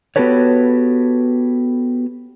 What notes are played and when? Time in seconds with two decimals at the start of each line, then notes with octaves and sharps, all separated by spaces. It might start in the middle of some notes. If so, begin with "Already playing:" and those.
0.16 B3 F#4 G4 A4 B4 C#5